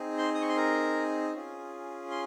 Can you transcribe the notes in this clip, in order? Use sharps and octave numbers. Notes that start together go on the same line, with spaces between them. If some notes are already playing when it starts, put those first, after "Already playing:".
Already playing: C4 D#4 G#4
C5 C6
D#6
C#6
C6
A#4 A#5
C#4 F4 G#4
C6